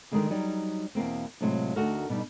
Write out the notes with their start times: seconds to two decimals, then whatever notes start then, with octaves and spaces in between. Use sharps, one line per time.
0.11 D3 D#3 G3 G#3 A#3 G#4
0.30 F#3 G3 D#4
0.95 E2 B2 A#3 C4
1.41 A2 C3 F#3 G#3 F4
1.76 D2 D#4 F#4 A4 A#4
2.09 B2 G3 D#4